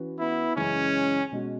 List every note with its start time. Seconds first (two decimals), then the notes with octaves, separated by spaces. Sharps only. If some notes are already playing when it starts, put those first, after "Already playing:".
Already playing: E3 C#4 F#4 B4
0.19 B3 E4
0.56 F#2 C#3 E3 G#3 C#4
1.32 B2 G#3 C#4 F#4